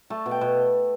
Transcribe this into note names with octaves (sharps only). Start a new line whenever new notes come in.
A3 A5
B2
G5
B2